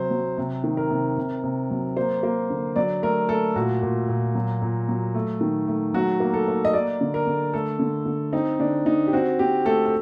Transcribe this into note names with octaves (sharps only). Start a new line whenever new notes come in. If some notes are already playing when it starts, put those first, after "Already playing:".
Already playing: C3 F#3 C5
F#3
C3
D#3
A#4
C3
C3
C3
F#3
A#3 C5
A#3
D3
F#3 D5
A3 A#4
A3 A4
A#2 F#4
A#2
A#2
F#3
A#2
F#3
A3
D#3
A3
F#3 F#4
A#3
A4
A#3
D#5
A#3 D5
D3
A#4
D3
A3 A4
D3
D3
C4 D#4
D3 D4
D3 D#4
G4
C4 F#4
C4 G4
A3 A4
A4